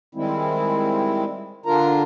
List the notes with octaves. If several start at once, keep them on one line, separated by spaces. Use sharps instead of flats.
D#3 G3 G#3 C4 E4
D3 D4 F4 A#4 A#5